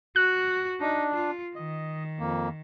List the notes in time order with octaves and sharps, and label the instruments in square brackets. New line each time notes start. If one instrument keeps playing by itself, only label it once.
[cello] F#4 [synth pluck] F#6
[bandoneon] D4 [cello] D#4
[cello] F4
[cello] D#3 [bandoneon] D#5
[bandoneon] F2 A#3